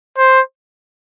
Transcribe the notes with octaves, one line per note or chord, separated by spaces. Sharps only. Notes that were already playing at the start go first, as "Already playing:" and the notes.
C5